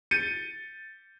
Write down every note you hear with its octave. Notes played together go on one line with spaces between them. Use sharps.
G6 A6 C#7 D#7